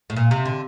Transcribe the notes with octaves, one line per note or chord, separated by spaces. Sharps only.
A2
A#2
C3
D3